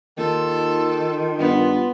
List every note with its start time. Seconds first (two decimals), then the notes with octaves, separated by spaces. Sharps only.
0.18 D#2 D#3 F4 A4
1.39 G2 B3